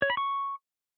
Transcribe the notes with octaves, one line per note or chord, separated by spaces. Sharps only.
C#5
B5
C#6